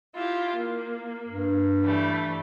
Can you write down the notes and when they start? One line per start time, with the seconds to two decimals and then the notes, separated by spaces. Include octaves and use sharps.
0.13 E4 F4 G4
0.55 A#3
1.28 G2
1.81 E3 G3 A3